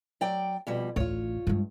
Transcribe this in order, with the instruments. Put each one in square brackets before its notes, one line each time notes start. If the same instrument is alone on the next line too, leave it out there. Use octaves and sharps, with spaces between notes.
[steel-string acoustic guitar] F#3 D5 G5
F2 B2 G3
[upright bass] A1 D2 [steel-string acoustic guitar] F4 C#5
[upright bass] G2 G#3